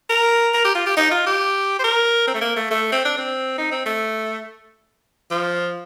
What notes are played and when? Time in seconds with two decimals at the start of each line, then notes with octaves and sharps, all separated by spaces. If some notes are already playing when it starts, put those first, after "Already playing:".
0.10 A#4
0.54 A#4
0.64 G4
0.75 F4
0.86 G4
0.97 D#4
1.11 F4
1.26 G4
1.79 C5
1.84 A#4
2.27 C4
2.34 A3
2.41 A#3
2.56 A3
2.71 A3
2.92 C4
3.05 D4
3.17 C4
3.58 D#4
3.72 C4
3.86 A3
5.31 F3